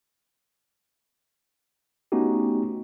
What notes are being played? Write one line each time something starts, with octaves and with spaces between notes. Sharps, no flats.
A3 B3 C#4 D#4 F#4 G4